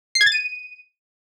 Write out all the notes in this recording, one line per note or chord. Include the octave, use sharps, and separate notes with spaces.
C7
G#6
A6
D#7